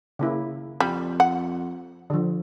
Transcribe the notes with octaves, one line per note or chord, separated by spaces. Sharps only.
C#3 A#3 E4
F2 G3
F#5
D3 F3